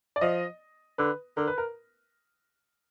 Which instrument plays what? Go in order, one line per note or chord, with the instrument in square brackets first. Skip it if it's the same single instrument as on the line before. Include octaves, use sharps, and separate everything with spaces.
[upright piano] D5
[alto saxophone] F3 [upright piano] D#5
[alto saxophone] D3 [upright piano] B4
[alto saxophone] D3 [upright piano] A#4
[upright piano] B4
A#4